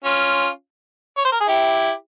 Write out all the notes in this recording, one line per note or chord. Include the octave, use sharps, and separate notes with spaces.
C#4 F4
C#5
C5
A#4
G#4
E4 G4